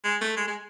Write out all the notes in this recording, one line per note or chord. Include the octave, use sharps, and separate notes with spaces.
G#3
A3
G#3
G#3